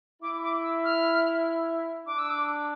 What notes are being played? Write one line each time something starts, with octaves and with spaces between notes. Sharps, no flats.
E4 D6
D6
E6
F6
D4 D6
E6
D6